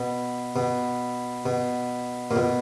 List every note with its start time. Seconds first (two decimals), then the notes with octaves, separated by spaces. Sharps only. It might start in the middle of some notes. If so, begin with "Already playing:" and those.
Already playing: B2
0.56 B2
1.46 B2
2.31 A#2
2.36 B2